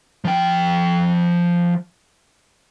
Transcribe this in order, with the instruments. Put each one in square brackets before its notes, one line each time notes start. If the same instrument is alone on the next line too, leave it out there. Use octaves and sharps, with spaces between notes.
[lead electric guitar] F3 G5